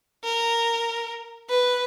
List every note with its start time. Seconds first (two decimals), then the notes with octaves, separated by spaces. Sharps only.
0.24 A#4
1.49 B4